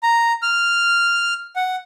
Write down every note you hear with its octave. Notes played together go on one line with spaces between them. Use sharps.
A#5
F6
F#5